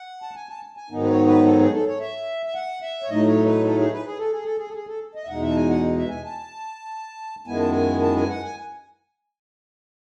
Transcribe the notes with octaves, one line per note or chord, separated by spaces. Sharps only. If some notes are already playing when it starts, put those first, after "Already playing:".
Already playing: F#5
A5
G#5
A5
G#5
G#2 D#3 F#3 B3 D#4
B4
C#5
B4
A4
G#4
A4
C#5
E5
E5
F#5
E5
C#5
A2 F#3 A3 D#4 D#5
C#5
B4
A4
G#4
B4
G#4
A4
G#4
A4
G#4
A4
G#4
A4
D#5
E5
E2 B2 G#3 D#4 F#5
E5
A5
G#5
F#5
E5
G#5
A5
F#2 D#3 G#3 B3 E4 G#5
A5
G#5
A5
G#5
F#5
G#5